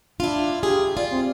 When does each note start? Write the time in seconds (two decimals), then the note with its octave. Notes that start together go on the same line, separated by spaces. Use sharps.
0.20 D4 E4 F4
0.63 G4 G#4
0.97 F4 D5
1.11 C4